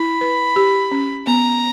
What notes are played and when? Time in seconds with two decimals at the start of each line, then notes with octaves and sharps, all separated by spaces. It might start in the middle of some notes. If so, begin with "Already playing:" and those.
Already playing: E4 B5
0.21 B4
0.56 G4
0.91 C#4
1.27 B3 A#5